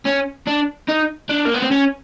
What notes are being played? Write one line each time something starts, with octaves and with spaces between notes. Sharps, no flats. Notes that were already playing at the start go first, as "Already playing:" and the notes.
C#4
D4
D#4
D4
A#3
B3
C4
C#4